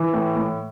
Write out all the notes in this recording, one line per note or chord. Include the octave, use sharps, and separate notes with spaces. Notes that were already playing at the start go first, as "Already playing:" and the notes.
Already playing: E3
A2
A2